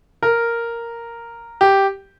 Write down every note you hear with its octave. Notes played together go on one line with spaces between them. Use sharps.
A#4
G4